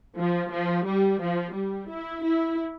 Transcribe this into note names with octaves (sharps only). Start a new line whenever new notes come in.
F3
F3
G3
F3
G3
E4
E4